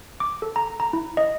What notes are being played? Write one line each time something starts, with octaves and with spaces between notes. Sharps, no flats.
D6
A4
A#5
A#5
E4
D#5